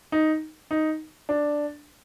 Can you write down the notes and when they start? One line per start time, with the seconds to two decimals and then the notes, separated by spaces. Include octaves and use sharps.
0.12 D#4
0.71 D#4
1.29 D4